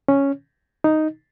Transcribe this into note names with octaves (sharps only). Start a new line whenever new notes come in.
C#4
D#4